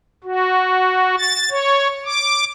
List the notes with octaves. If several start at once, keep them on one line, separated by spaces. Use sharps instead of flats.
F#4
A6
C#5
D6